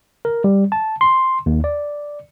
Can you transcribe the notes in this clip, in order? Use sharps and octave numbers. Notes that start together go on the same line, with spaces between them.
A#4
G3
A5
C6
D#2
D5